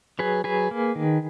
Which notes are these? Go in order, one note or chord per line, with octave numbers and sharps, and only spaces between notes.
F#3 G#4 B4
F#3 G#4 B4
A#3
D#3